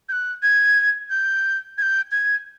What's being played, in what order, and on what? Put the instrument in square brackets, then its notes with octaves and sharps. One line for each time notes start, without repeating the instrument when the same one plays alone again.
[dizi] G6
F#6
G#6
G6
G#6
G6
G#6